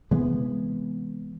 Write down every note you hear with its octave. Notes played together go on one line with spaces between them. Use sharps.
C3 E3 G#3 B3